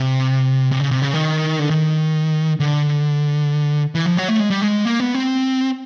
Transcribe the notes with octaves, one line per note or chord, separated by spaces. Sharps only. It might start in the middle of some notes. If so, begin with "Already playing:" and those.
Already playing: C3
C3
C#3
C3
C#3
D#3
D3
D#3
D3
E3
F3
F#3
A3
G#3
G3
G#3
A#3
B3
C4